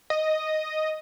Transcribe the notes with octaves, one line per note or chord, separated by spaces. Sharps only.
D#5